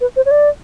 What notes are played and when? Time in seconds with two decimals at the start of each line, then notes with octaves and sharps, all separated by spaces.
0.01 B4
0.16 C5
0.26 C#5
0.31 D5